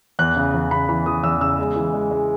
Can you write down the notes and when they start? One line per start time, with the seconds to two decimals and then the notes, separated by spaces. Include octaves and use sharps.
0.19 E2 F#6
0.36 C#3
0.54 E2
0.71 C#3 B5
0.89 E3 B5
1.06 E3 D#6
1.23 E2 E6
1.41 C#3 E6
1.59 G#3
1.76 E3
1.93 G#3
2.11 G#3